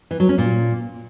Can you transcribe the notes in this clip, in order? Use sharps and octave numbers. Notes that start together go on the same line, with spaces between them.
E3
F#3
C#4
A#2